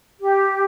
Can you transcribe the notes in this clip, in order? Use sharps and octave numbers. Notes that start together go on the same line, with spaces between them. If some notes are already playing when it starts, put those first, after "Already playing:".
G4